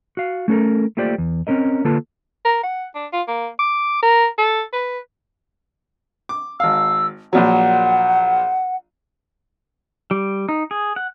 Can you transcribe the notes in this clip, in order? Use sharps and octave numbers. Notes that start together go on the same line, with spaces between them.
F#4 F5
A3 C#4 F#4 A4 A#4
A3 A#3 F4 G4 C5 D5
E2
C4 C#4 A#4 D#5
D3 A#3 F4 A4 B4 A5
A#4
F#5
D4
F4
A#3
D6
A#4
A4
B4
D6
G#1 F5 E6
A#1 A#2 F#3 F#5
G3
D#4
G#4
F#5